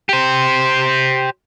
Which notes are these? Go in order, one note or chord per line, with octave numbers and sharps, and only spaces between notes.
G4 C5